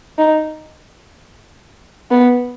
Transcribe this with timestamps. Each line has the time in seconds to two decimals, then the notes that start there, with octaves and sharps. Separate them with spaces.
0.18 D#4
2.11 B3